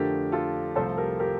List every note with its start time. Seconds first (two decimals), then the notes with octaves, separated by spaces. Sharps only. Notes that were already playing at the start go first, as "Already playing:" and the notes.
Already playing: F2 D3 F3 A3 D4 G4 A#4
0.32 F4 A4
0.76 C2 C3 F3 A3 A4 C5
0.97 G4 A#4
1.19 G4 A#4